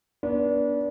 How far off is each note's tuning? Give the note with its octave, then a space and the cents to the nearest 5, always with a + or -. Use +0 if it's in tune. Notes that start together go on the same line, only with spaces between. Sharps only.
B3 -35 D4 -25